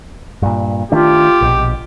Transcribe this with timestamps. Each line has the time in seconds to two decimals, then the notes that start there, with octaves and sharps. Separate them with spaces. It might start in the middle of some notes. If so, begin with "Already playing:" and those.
0.42 G2 A#2
0.92 D#3 A3 D4 F4 G4
1.41 A#1 B2